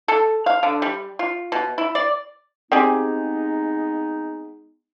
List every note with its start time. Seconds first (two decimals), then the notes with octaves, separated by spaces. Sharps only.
0.08 A4
0.46 F5
0.63 D3
0.82 G3
1.19 F4
1.52 B2
1.78 E4
1.95 D5
2.72 G#3 B3 C4 D#4 G4 G#4